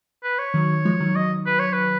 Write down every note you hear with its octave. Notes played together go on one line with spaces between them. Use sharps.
B4
C#5
D#3 F#3
F3 G#3
D#3 F#3
D#5
B4
C#5
B4